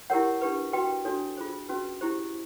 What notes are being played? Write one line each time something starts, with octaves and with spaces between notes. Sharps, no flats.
E4 G4 A#4 C#5 F#5
D4 G4 B4
F#4 B4 G5
D4 F#4 A4 C#5
F4 G#4 C5
C#4 F#4 B4
E4 G4 C5